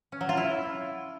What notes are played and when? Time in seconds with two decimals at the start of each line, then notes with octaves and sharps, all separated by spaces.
0.12 C#4
0.21 F#3
0.29 F4
0.37 E4